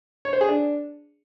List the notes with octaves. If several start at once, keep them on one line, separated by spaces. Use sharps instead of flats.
C#5
C5
G#4
D4